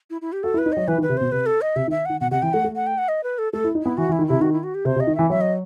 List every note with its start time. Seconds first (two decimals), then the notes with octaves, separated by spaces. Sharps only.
0.10 E4
0.21 E4
0.32 G4
0.43 F#4 A4
0.54 E4
0.58 B4
0.66 D#4
0.72 F#3 D#5
0.88 E3 B4
0.98 D#3
1.02 B4
1.09 C3
1.17 B2 C5
1.32 C3 B4
1.46 A4
1.61 D#5
1.76 C3 E5
1.87 D#3
1.91 E5
2.05 D#3 F#5
2.20 B2 F#5
2.31 C3 F#5
2.42 E3 G5
2.53 A3 F#5
2.64 A3
2.75 F#5
2.87 G5
2.98 F#5
3.08 D#5
3.23 B4
3.38 A4
3.53 A3 A4
3.64 E4
3.75 D#4
3.82 B3 E4
3.97 E3 F#4
4.09 E3
4.12 E4
4.19 D#3
4.27 C3 E4
4.41 D#3 F#4
4.52 E4
4.63 F#4
4.74 G4
4.85 C3 C5
4.96 C3
5.00 D#5
5.07 D#3
5.15 E3 E5
5.30 F#3 E5
5.41 D#5